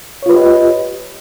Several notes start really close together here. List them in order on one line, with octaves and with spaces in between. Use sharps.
C#5 F4 B4 G4 D#5